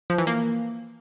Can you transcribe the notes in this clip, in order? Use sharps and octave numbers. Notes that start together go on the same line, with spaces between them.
F3
E3
A#3